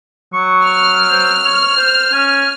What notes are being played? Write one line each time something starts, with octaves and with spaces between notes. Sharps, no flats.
F#3 C#6
F6
C5
C#5
C5
C#4 G#5